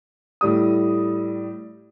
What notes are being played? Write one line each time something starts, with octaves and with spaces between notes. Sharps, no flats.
A2 G3 D#6